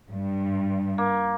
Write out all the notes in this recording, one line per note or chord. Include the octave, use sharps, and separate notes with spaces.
G2
A#3